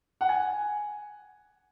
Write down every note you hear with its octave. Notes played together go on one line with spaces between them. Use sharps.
F#5
G#5